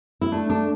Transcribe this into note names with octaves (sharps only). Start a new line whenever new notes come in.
E4
A3 D4
D4